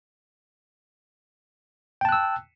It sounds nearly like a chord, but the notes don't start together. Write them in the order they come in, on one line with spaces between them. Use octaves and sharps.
G5 A5 F#6 E6